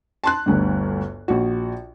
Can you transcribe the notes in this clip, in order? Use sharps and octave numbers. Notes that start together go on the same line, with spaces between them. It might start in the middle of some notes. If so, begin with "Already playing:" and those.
A5 C6 F#6
G1 D2 G2
A#1 F#4